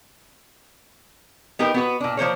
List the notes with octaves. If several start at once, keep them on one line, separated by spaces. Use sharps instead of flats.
B3 D#4 G4 A#4
B3 F#4 B4
A#2 D4
F3 A#3 C5 C#5